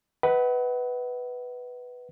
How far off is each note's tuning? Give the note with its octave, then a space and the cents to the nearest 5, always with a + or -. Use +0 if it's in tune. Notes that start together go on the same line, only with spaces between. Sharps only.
B4 +0 D#5 +45 F#5 +25